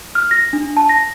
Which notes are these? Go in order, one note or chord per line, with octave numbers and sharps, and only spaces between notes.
F6
A#6
D4
A5
A#6